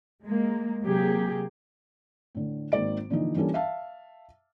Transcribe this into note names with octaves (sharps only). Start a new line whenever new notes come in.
G#3 A#3
C3 F#3 A#3 G4 G#4
A2 D3
G#1 D#3 A#3 D5 D7
A#2 D3 E3 F3 D#4
E3 G3 A#3 C#4 D4 A4
E5 F5 A5